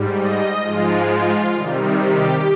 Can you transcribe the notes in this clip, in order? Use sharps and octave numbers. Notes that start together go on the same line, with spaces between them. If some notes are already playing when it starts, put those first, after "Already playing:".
Already playing: G#2 G3
D#5
G#2 F3 G#3 F4
F4
C3 D#3 G3
G4